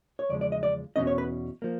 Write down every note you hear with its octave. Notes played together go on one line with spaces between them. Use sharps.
C#5
E2 C#3 F3 G#3 D5
D5
D#5
D5
E2 B2 G#3 C#4 D#5
C#5
B4
F3 A#3